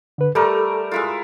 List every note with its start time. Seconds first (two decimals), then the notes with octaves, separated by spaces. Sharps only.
0.18 D3 B4
0.35 G3 A3 A4 A#4
0.91 G#3 E4 F4